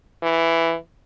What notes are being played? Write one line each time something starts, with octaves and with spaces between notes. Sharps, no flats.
E3